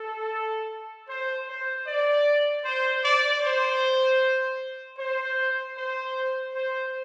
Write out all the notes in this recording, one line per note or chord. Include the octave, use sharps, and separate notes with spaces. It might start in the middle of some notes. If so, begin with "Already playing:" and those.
Already playing: A4
C5
C5
D5
C5
D5
C5
C5
C5
C5